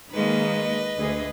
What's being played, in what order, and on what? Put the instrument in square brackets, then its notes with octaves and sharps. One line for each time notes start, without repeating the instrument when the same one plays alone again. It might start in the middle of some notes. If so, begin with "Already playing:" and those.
[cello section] D#3 G#3 A#3 [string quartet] B4 D#5
[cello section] D2 G#4